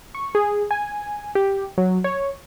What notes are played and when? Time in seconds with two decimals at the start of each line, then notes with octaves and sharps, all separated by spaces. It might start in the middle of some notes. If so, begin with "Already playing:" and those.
0.14 C#6
0.35 G#4
0.71 G#5
1.35 G4
1.78 F#3
2.04 C#5